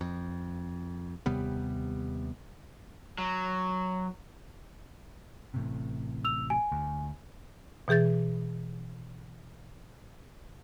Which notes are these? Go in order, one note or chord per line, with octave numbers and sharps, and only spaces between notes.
F2
D#2 C3 G3 B3
F#3
A1 A2 C3
E6 F7
G#5
D2
B2 E3 G#4 G6 A6